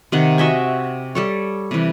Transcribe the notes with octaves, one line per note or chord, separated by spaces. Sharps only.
C3 D#3 F#5
F#4 D#5 E5 G#5
G3 A4 C#5
C3 E3